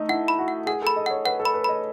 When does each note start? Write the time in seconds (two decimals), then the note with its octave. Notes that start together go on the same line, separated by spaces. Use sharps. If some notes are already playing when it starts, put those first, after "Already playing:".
Already playing: A3 D#4
0.09 E4 F#5
0.28 B5
0.38 F#4
0.48 F#5
0.67 G#4 F#5
0.82 A4 B5
0.96 D#5
1.06 C#5 F#5
1.25 B4 F#5
1.40 A4
1.45 B5
1.54 B4
1.64 D#5 B5